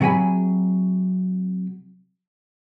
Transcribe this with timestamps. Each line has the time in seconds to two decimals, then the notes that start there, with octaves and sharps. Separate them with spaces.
0.01 C3 F#3 G#4 G#5 B5